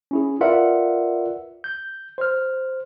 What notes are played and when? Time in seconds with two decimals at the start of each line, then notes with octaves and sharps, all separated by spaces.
0.11 C#4 E4 G#4
0.41 F4 A#4 B4 D5 E5 F#5
1.64 G6
2.18 C5 F6